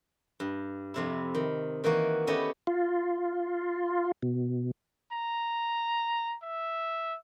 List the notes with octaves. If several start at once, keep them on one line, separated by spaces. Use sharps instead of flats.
G2
F2 C3 E4
D#3
D#3 E3 A#3 F#4
A3 B3 C#4 E4 G4 D#5
F4
B2
A#5
E5